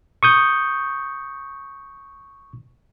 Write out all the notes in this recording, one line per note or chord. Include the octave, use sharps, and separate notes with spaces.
C#6 D#6 G6